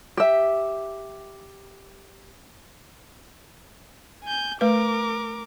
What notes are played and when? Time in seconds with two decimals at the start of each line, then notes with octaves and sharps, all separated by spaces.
0.17 G4 E5
4.24 G#5 G6
4.61 A3 A#4 B4 D6